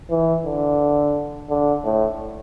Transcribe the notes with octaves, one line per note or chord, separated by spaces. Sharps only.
E3
D3
D3
A2